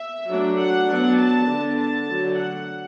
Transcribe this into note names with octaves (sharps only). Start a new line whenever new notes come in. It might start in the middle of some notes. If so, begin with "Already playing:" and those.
Already playing: E5
F#3 A3 D4
F#5
F#3 B3 D4
A5
D3 B3 D4
A5
D3 F#3 A3 D4
F#5